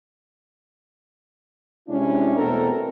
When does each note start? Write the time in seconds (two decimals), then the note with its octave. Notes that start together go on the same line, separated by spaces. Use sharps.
1.88 C3 G#3 C#4 D4 E4
2.37 E2 B2 A3 C4 A4 A#4